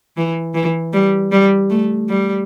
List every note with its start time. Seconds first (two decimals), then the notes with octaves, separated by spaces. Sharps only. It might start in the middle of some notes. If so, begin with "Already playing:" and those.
0.17 E3
0.55 E3
0.93 G3
1.32 G3
1.70 A3
2.09 G3